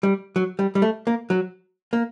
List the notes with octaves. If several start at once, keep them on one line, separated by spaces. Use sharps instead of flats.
G3
F#3
G3
G3
A3
A#3
F#3
A#3